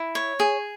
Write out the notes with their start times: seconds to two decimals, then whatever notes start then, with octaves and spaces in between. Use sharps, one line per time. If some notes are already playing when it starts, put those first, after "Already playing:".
Already playing: E4
0.15 C#5
0.40 G#4